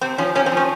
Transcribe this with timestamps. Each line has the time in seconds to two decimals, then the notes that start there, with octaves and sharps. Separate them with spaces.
0.01 C3 C4
0.18 F3 C#4
0.35 C3 C#4
0.46 C4
0.52 F3
0.57 C#4